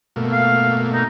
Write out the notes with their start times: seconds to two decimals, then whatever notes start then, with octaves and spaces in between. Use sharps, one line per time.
0.16 B2 A3 A#3
0.33 F5
0.93 D#4